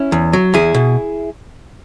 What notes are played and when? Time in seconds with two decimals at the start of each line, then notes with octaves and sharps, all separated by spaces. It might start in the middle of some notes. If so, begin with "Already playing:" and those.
Already playing: C#4 E4
0.12 E2
0.33 F#3
0.54 E2 E4 G#4
0.74 B2